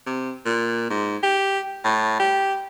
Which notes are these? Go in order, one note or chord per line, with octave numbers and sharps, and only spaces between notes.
C3
A#2
G#2
G4
A2
G4